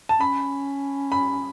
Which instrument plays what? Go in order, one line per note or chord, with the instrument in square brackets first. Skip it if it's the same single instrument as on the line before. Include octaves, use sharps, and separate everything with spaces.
[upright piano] A5
[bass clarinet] C#4 [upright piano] B5
[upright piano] B5